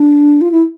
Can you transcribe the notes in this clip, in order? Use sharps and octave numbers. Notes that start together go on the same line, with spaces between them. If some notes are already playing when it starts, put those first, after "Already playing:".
Already playing: D4
F4
E4